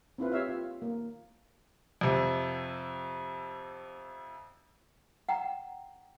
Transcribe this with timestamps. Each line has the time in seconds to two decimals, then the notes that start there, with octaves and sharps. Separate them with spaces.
0.18 C4 E4 F4 B4
0.32 G4 C#5 E5 F5
0.49 F4
0.82 A#3
2.01 F2 C3
5.29 F#5 G5 A#5